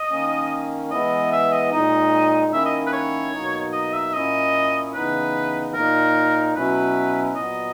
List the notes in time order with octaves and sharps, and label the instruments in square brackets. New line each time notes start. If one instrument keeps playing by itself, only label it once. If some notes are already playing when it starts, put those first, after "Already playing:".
Already playing: [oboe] D#5
[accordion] D#3 A#3 C#4
[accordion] E3 G#3 B3 E4 [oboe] D#5
[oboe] E5
D#5
[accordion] A#2 G#3 D#4 [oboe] D#5
[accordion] D#3 A#3 C#4 E4 [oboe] E5
[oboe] D#5
B4
C#5
[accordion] B2 F#3 A#3 D#4
[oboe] D#5
E5
[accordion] A#2 A#3 C#4 E4 [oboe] D#5
[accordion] C#3 E3 B3 D#4 [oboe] B4
[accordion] A#2 A#3 D#4 [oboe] A#4
[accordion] B2 F#3 C#4 E4 [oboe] B4
[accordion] A#2 F#3 B3 [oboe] D#5